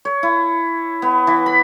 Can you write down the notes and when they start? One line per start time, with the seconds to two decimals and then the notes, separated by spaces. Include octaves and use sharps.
0.05 C#5
0.23 E4
1.02 B3
1.27 E3
1.46 B5